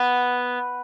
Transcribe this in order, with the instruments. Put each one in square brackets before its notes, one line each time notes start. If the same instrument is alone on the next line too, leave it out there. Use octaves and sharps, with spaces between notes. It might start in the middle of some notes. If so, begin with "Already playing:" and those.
Already playing: [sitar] B3